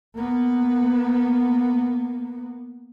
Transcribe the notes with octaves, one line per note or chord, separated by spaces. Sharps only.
A#3 B3